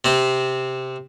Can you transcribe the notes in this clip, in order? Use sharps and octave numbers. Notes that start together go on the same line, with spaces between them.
C3 C4